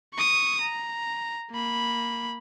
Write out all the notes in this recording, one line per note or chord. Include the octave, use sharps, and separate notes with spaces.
C#6 D#6
A#5
A#3 B5